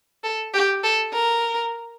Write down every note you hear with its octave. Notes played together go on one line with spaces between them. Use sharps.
A4
G4
A4
A#4